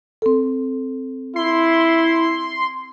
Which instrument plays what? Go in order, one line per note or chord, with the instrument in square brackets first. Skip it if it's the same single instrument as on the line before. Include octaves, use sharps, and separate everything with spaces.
[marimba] C4 A4
[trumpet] E4 [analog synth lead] C6